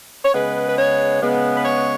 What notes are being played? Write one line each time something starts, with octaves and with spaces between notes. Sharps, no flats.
C#5
C#3 G#3 B3 B4
B4
C#5
C#3 G#3 B3
B4
C#5